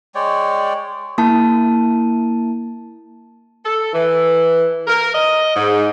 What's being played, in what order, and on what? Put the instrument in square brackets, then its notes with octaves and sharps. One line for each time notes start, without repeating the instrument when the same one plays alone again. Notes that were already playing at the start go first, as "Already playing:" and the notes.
[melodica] G#3 C#5 D5 G5
[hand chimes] A#3 E4 A5
[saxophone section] A4
E3
A#4
D#5
G#2